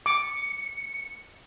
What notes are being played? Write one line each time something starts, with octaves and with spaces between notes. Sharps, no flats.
D6 C#7